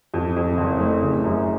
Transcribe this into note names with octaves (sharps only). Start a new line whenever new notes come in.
F2
F2
F#1
A3
C#3
F#2